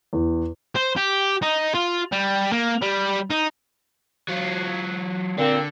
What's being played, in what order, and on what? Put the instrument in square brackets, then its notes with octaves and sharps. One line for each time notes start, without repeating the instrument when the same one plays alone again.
[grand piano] E2
[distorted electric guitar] C5
G4
D#4
F4
G3
A#3
G3
D#4
[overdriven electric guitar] F#3 F4
[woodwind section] A#2 C4 [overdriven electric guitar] D3